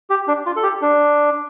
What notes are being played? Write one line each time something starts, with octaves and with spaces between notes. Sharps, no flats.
G4
D4
F4
A4
G4
D4